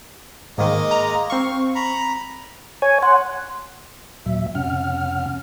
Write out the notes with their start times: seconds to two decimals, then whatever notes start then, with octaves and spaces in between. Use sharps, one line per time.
0.58 G#2 D#3 G#3 A#3 D#5
0.91 A#5
1.30 C4 F5 C#6
1.75 A#5 B5
2.82 C#5 G#5
3.03 F#5 C6
4.26 D#2 A#2 F#3 E5
4.55 F2 C3 C#4 F#5 F6